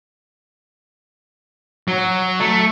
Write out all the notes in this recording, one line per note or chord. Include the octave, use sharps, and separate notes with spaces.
F#3
A3